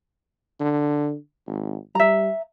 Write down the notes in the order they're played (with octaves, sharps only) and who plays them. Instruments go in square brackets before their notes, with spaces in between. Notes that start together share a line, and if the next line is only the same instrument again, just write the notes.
[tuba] D3
G#1
[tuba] G3 [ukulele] E5 A#5